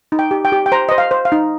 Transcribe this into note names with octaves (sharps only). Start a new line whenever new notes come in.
D#4
G5
G4
G5
G4
G5
C5 A#5
C5 D#5
F5
C5
F5
D#4